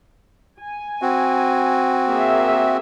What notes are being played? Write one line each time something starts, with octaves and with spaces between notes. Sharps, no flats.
G#5
C4 F#4
A#3 G#4 E5